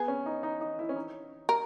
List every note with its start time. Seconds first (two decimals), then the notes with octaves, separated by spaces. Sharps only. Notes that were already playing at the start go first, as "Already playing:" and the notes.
Already playing: B3 G#4
0.08 C#4
0.26 D#4
0.43 D#4
0.61 D#4
0.79 E4
0.89 C#4
0.96 D#4
1.49 A#4